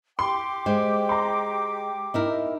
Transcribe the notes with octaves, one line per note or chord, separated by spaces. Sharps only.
G4 G5 C6 D6
G#3 C5
A#5 C6
D#4 E4 A#4